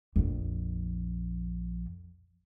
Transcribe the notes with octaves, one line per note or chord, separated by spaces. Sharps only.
A#1 F2